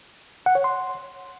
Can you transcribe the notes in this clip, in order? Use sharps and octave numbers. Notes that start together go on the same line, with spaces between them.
F#5
C#5
C6